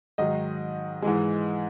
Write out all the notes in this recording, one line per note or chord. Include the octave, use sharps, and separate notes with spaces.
G#2 D#3 F#3 D#5
G#2 E3 G#3